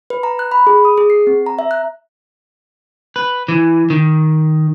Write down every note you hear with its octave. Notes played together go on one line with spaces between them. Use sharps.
B4
A#5
F#6
B5
G#4
D#6
G#4
C7
C4
A#5
E5
F#6
B4
E3
D#3